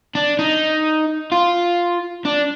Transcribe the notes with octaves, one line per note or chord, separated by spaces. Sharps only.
D4
D#4
F4
D4